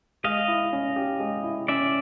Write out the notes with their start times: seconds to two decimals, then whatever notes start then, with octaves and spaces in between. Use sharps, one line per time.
0.24 G#3 D#5 F5
0.48 E4
0.73 C#4
0.96 G4
1.20 G#3
1.44 E4
1.68 C#4 D5 E5